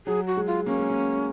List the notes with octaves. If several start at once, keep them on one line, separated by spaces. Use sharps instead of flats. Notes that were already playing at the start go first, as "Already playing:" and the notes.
F#3 G#4
F#4
G#3
F4
A#3 C#4
G#3
A#3